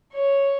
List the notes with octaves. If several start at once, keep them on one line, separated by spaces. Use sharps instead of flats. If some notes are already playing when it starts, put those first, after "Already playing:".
C#5